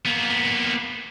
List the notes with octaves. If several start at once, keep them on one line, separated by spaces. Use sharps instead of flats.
A#3 B3